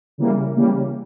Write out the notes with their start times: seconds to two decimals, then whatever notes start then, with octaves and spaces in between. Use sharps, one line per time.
0.18 C#3 E3 G3 A#3
0.56 C#3 E3 G3 A#3